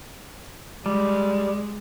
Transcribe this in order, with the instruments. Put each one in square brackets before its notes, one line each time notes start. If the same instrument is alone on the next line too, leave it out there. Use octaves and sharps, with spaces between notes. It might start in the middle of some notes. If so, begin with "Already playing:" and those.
[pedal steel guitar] G3 [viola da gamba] G#3